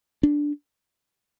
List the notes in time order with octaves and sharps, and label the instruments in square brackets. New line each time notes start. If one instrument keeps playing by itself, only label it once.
[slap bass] D4